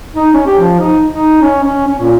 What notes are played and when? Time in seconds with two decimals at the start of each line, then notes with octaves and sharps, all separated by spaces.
0.16 D#4
0.34 C#4
0.47 G4
0.59 F3
0.79 D#4
1.08 D#4
1.42 C#4
1.63 C#4
1.87 C#4
1.99 A#2